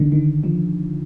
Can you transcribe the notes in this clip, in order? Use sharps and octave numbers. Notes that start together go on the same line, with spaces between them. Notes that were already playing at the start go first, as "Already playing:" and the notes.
Already playing: D3 D#3
D#3
F3